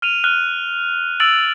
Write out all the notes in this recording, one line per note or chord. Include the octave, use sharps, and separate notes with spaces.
F6 D#7 F7
F6 F#6 D#7
E6 A6 D7 F7 F#7